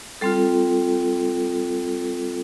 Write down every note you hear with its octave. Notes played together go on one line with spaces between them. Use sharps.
G3 C4 F4 A4